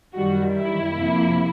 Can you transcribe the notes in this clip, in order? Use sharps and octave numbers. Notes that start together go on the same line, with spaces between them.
F#2 D#3 G3 F#4
E4
F2 C3 F3 A#3